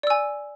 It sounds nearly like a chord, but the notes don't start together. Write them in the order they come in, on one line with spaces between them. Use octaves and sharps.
D5 E6 G#5